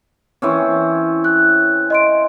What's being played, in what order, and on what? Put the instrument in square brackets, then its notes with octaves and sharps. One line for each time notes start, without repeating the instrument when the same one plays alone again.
[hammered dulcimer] E3 C4 C#4
[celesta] F#6
D#5 C6 D7